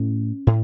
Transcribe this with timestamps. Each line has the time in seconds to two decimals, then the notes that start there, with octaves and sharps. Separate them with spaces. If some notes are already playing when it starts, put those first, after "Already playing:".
Already playing: A2 C#4
0.47 A2